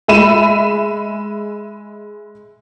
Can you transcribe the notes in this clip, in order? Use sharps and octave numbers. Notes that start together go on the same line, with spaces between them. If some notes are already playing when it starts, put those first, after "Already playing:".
G#3 E5 B5 D#7 E7